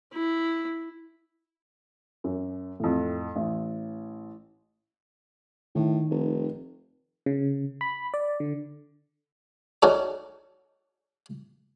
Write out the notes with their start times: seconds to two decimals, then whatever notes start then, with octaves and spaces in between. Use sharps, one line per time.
0.13 E4
2.24 F#2
2.80 F2 A2
3.36 A1
5.75 A2 D#3
6.10 F1
7.26 C#3
7.81 B5
8.14 D5
8.40 D3
9.82 C#4 D#4 F#4 A4 D5